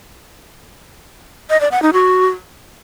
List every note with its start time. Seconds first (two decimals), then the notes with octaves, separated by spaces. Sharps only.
1.50 D#5
1.61 D5
1.72 F#5
1.82 D#4
1.93 F#4